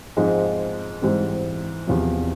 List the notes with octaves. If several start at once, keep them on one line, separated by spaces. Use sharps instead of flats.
G#2 F3 G#3 C4 D#4
G#2 E3 G3 C4
E2 C3 F3